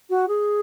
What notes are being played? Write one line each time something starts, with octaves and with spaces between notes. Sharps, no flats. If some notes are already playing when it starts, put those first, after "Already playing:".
F#4
G#4